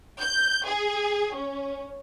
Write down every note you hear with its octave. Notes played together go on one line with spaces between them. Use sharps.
G6
G#4
C#4